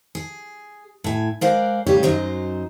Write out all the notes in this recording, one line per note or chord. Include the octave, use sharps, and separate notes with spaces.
G#4
A2 G#5
G#3 A#4 C5 D5 F5 F#5
A2 C#3 G3 G4 C#5
F#2 F#3 D#4 C5